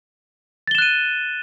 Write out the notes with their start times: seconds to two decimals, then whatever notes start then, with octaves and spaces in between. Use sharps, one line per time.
0.67 A6
0.71 G7
0.75 E7
0.78 F#6
0.82 D#7